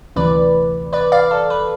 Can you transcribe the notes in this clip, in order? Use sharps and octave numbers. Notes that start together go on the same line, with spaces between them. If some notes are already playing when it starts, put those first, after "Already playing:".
D2 C3 E3 B4 D5
B4 D5
D5 F5
A4
B4